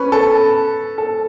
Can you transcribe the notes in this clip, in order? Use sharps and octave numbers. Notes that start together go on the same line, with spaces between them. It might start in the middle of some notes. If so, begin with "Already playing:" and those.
Already playing: C#4 B4
A4
A4